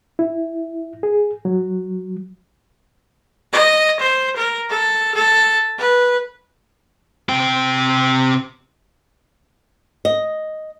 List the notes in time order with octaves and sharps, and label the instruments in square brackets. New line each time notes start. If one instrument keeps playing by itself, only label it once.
[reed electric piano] E4
G#4
F#3
[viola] D#5
C5
A#4
A4
A4
B4
[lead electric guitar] C3 G5
[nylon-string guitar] D#5